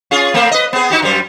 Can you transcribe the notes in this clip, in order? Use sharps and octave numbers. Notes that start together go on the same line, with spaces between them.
C#4 F4 G#4
A3 A#3 C4
B4 D#5
B3 C4 G#4
D#4 F#4 G4
F#2 G3 C5